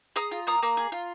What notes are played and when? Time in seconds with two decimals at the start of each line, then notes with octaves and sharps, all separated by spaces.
0.16 G#4 A#5 D#6
0.31 F4
0.47 A#3 A#5 D#6
0.63 A#3
0.77 G#4
0.92 F4